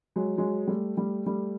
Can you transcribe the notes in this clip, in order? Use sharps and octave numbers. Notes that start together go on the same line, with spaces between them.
F#3 G#3
F#3 G#3
G3 A3
G3 A3
G3 A3